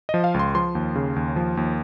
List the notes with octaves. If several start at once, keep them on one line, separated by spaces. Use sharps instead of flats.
F3 D#5
F5
C#2
C6
F3 C6
D#2
C#3
D#2
F3
D#2